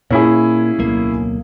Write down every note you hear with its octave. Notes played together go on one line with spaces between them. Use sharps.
A#2 A#3 C#4 E4 G#4
D1 B1 A#3